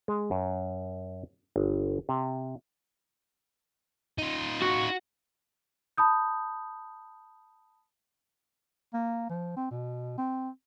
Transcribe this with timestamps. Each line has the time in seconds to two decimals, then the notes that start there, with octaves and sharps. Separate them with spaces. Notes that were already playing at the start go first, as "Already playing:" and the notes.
0.08 G#3
0.31 F#2
1.56 G1
2.09 C3
4.18 D#4 F4
4.62 F#4
5.97 A5 B5 D#6 G6
8.94 A#3
9.30 F3
9.57 C4
9.71 B2
10.18 C4